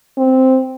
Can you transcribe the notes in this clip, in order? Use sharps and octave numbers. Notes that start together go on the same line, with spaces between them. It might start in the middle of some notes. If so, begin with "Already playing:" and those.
C4